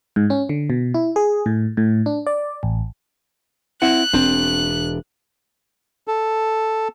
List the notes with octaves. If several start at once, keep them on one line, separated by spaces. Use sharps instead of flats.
G#2
C#4
D3
B2
E4
G#4
A2
A2
D4
D5
A1
C4 E4 F#5 F#6
E1 C4 D4
A4